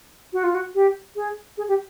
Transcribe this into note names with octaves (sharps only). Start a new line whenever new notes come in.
F#4
F4
F#4
G4
G#4
G#4
G4